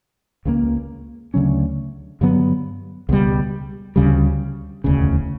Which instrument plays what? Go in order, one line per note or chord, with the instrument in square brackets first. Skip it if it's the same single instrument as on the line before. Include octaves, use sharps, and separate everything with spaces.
[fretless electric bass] C#2 C#3 G3 A#3
D2 C#3 F#3 C#4
G2 D3 F#3 B3
C#2 B2 G3
D2 C#3 G3
E1 D2 C#3